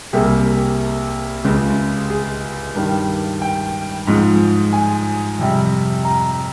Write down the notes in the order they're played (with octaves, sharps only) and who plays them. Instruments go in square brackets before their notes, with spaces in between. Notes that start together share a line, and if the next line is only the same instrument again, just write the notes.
[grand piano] C2 C3 G3 A#3 G#4
C#2 C#3 G#3
G#4
G2 D#3 G3
G5
G#2 F3 G#3
G#5
F2 C3 G3
A#5